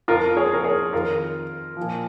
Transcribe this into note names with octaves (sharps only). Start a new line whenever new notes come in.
F2 F3 F4 A#4
G#4 C#5
A#4
G#4 C#5
F2 D#3 F4 A#4
A#2 F3